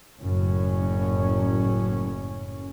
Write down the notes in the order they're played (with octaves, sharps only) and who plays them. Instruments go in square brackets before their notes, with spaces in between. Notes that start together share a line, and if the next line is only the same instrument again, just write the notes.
[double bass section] F#1 F#2 A2 C#4